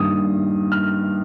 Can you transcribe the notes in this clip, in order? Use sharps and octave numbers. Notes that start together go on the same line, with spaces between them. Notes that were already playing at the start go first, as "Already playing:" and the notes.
Already playing: G2 D#3 A#3 D#6
F6